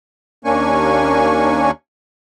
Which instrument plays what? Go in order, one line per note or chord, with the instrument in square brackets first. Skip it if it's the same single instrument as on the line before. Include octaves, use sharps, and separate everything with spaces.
[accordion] D#2 A#3 C#4 D4 G#5 C#6